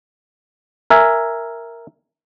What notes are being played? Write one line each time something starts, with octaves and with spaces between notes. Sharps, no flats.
A#4 E5 G#5